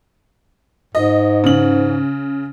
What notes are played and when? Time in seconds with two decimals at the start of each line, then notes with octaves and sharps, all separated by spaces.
0.95 G#2 D#5
1.44 C#3 F#7